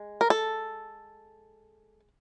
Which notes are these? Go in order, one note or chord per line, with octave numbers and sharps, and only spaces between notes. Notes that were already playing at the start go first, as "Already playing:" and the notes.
Already playing: G#3
A#4
A4